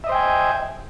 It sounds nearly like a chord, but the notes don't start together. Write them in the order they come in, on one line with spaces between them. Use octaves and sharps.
E5 D#5 C5 G5 G#5